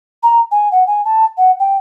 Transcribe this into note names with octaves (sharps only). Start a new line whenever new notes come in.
A#5
G#5
F#5
G#5
A5
F#5
G5